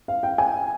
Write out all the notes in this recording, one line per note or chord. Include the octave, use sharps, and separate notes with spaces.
F5
G5
G#5